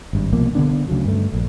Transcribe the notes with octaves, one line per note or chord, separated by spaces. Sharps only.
G#1 G2
C2 B2 F3 A#3
D3 E3 B3 D4
D2 C#3 F3 F#3
G2 A3
A#1